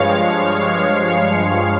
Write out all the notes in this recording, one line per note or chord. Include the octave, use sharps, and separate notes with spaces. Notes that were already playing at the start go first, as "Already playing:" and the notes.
Already playing: G2 F3 G#3 C#5 F5
C#5
C#5
C#5